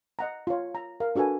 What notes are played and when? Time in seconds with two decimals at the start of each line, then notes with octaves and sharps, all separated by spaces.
0.19 D#5 F#5 A#5
0.47 F4 C#5
0.75 A#5
1.00 A#4 F5
1.16 D4 F#4 A4 B4 G#5